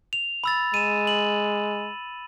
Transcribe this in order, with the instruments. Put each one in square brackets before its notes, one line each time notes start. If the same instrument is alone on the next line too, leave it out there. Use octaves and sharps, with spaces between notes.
[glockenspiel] F7
B5 E6 A6
[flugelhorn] G#3 [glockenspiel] D#7 E7
[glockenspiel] F#7